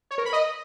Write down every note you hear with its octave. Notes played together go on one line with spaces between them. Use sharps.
C#5
A#4
B5
D#5